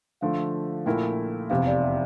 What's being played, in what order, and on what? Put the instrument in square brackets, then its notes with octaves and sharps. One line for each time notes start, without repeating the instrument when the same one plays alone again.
[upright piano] D3 F3 A3 [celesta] F5
[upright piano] A#1 A#2 A3 E4 A#4 [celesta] G5
[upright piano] F1 E2 C3 [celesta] F5
[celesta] D5
E5